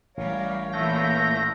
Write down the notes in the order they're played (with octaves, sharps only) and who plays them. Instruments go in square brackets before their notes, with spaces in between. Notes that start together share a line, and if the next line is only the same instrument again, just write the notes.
[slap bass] A1 [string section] G3 A#4 [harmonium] C#5 F5
[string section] A#2 E3 [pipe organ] A3 G6 A#6